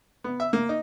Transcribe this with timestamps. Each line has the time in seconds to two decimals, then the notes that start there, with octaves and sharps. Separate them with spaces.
0.24 B3
0.40 E5
0.53 A#3
0.69 D#4